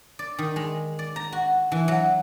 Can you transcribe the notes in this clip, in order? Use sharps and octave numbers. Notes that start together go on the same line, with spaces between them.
D5
D#3
G#3
D5
A#5
F#4
E3
F#3